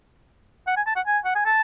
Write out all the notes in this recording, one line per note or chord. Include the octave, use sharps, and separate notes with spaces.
F#5
G#5
A5
F#5
G#5
F#5
G#5
A5